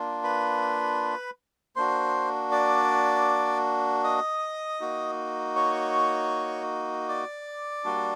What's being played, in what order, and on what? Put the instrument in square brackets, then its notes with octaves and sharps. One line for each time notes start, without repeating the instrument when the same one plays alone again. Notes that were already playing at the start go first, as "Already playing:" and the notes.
Already playing: [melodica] A#3 D4 F4
B4 B5
A#3 D4 F#4 C5 C6
D5 D6
D#5 D#6
A#3 D#4 F#4
C#5 C#6
D5 D6
G3 A#3 D4 F#4